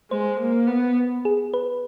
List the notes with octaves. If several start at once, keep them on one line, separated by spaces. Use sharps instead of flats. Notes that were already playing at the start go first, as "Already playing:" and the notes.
G#3 C5
A#3
B3
G#4
B4